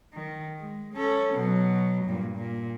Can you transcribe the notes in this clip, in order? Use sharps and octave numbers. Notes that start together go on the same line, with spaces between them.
D#3
G#3
C#4 A4
B2 F#3
G2 A#2
A#2